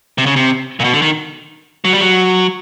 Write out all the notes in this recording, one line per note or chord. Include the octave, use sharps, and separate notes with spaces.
C3
C#3
C3
A#2
B2
D3
D#3
F#3
G3
F#3